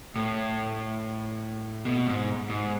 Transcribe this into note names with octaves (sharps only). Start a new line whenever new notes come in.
A2
B2
G#2
G#2